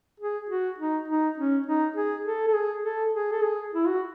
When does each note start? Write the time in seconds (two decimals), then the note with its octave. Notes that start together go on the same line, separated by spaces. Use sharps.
0.20 G#4
0.49 F#4
0.79 D#4
1.08 D#4
1.38 C#4
1.66 D#4
1.96 G#4
2.25 A4
2.47 A4
2.54 G#4
2.84 A4
3.13 G#4
3.32 A4
3.42 G#4
3.73 E4
3.87 F#4